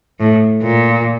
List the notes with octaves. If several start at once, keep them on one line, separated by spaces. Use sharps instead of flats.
A2
A#2